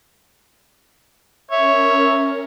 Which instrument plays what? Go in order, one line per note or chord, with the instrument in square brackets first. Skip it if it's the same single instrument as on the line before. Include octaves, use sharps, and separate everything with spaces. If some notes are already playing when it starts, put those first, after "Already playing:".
[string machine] C#4 A#4 [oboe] C#5 [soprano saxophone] E5